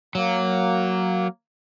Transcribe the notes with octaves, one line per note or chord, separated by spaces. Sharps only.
F#3 A#3